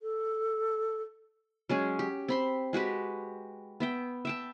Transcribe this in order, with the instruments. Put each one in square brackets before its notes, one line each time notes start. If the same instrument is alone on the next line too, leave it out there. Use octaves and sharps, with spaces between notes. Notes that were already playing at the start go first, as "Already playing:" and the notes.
[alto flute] A4
[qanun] F#3 G#3 C#4 G#4
G4
C4 B5 C6
G#3 F#4 G4 B4
B3 E5 G5
E5 G5 A5